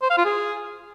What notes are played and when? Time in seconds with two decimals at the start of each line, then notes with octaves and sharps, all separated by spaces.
0.02 C5
0.10 F5
0.18 F4
0.25 G#4